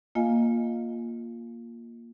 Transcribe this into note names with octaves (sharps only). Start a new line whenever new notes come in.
A#3 F4 D#5 F5 G#5